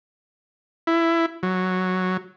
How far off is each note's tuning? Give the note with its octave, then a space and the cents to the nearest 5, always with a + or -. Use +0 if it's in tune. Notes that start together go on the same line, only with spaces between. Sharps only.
E4 +15
F#3 -5